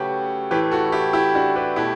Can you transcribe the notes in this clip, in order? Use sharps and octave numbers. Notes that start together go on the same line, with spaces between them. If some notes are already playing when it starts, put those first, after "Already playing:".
Already playing: C#3 F#3 A3 F#4 G4 A4 B4 C#5
A2 E3 A3 G4 B4
F#4 A4
E4 G4
E4 G4
D4 F#4
G4 B4
B2 A3 E4 G4